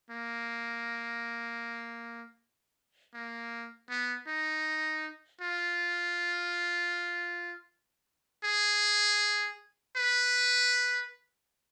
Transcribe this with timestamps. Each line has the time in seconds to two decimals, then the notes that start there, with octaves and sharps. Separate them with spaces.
0.10 A#3
3.14 A#3
3.89 B3
4.27 D#4
5.41 F4
8.44 G#4
9.96 B4